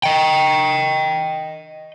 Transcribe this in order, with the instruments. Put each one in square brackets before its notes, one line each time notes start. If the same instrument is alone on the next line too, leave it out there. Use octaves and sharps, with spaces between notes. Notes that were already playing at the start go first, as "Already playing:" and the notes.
[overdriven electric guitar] D#5 G5